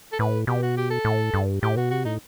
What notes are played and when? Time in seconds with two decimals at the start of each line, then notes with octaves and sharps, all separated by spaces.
0.12 A4
0.19 A2 B4
0.47 B2 G4
0.62 F#4
0.77 G4
0.90 A4
1.05 A2
1.34 G2
1.62 A2 G4
1.76 B2 F#4
1.90 C3 F#4
2.05 A2 D#4